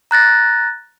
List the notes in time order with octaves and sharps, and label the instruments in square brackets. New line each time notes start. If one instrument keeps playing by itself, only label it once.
[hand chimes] A#5 F#6 A6 A#6